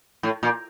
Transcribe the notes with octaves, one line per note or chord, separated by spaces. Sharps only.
A2
A#2